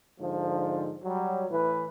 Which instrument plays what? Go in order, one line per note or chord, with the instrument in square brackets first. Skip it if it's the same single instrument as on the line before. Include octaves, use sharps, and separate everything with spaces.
[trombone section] G#2 D3 F3
F#3 G3
A2 E3 B4